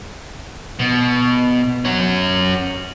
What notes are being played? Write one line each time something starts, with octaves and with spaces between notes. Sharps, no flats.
B2
C#4 F#4